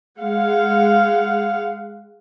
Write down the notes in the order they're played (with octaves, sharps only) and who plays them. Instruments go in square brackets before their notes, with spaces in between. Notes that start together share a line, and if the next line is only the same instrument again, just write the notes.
[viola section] G#3 F5 F#5